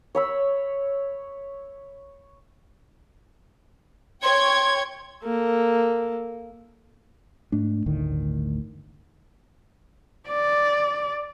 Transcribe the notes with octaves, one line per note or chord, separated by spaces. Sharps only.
C#5 B5 E6
C#5 G5 C6 G#6
A#3 A4
G#2 A3 D4
G1 D2 A2 D#3
D5